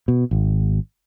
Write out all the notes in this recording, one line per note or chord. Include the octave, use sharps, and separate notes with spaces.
B2
G#1